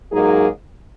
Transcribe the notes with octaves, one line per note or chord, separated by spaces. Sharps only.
G#2 F#3 A#3 D#4 G#4